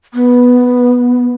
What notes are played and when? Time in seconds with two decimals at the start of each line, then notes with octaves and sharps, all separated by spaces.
0.14 B3